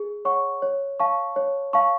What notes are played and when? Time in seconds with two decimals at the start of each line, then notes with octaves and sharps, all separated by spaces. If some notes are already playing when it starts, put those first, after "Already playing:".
Already playing: G#4
0.25 C#5 F#5 C#6
0.62 C#5
1.00 F5 A5 C#6
1.36 C#5
1.73 F5 A5 C#6